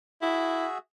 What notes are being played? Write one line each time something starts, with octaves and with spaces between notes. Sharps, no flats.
E4 F#4 G#4 E5